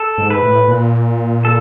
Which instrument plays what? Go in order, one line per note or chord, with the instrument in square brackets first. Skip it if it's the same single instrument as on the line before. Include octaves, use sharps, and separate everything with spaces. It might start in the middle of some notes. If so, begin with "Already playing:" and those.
Already playing: [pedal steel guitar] A4
[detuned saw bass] G#2
[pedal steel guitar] B4
[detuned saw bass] A2
A#2
[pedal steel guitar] A4